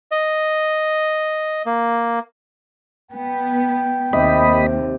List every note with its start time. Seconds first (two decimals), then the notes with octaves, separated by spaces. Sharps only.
0.11 D#5
1.66 A#3
3.12 B3 G5
4.13 D#2 C3 D#5 B5